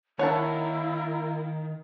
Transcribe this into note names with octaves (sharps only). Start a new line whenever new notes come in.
D#3 A#3 E4 A#4 C#5 F#5 A5